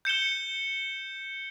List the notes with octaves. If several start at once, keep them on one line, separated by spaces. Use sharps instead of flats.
G6 C#7 E7 G7